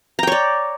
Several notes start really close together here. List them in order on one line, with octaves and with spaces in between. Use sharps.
A#5 G5 C#5 D5